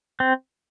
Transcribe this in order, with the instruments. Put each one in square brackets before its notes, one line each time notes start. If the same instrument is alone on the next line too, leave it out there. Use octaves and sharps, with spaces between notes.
[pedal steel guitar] C4